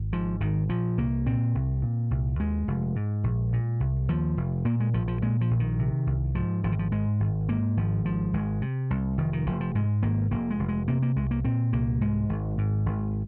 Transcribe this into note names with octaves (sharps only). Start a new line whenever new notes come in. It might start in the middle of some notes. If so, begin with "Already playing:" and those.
Already playing: G#1
G#2 F3
G#1 D#3
A#2 F3
C2 A#3
A#2 C4
C2
A#2
C2
D#2 G#3
F1
G#2
A#1
A#2
C2
D#2 F3
F1
A#2 A#3
G#3
A#1 F3
F3
A#2 G#3
F3
A#1
D#3
C3
C2
G#2 F3
G#1 F3
D#3
F3
G#2 G#3
G#1
G#2 A#3
G#1 F3
G#2 F3
G#1 G#3
C3
C2
F1 D#3
D#3
F1 F3
F3
G#2 G#3
G#1 A#3
F1 A#3
G#3
F1
G#3
C3 A#3
A#3
C2 G#3
A#3
A#2 C4
C2 A#3
G#2 G#3
G#1
G#2
G#1